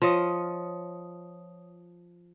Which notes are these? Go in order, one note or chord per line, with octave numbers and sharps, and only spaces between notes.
F3 F4 C#5 D#5 D#6